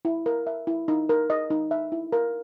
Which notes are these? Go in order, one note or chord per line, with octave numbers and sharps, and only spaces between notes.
E4
A#4
E5
E4
D#4
A#4
D#5
D#4
E5
E4
A#4